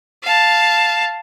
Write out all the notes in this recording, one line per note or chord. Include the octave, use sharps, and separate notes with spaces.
F5 A5